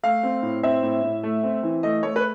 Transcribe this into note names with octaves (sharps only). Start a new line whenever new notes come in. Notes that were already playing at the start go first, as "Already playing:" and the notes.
A3 F5
C4
A2
C4 E5
A2
A2
A3
C4
E3
A3 D#5
A3 C#5
B4